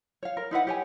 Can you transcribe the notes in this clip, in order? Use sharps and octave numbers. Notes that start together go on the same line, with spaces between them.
C#5 F5
A#4
D#4 E4 B4 F#5
G4 C#5 G#5